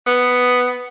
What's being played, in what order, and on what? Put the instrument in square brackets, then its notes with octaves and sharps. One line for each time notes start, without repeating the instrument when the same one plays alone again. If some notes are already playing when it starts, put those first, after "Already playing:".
[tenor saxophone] B3